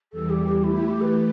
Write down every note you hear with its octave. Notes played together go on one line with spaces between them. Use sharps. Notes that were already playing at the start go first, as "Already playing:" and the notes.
E2 E3 G3 A4
G4
G4
E3 A3 E4 G4
E4
G4
B4